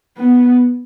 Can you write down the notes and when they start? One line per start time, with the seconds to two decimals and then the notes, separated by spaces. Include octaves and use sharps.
0.17 B3